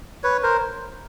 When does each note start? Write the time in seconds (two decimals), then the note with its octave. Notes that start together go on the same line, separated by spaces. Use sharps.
0.23 B4 C#5
0.43 A#4 C5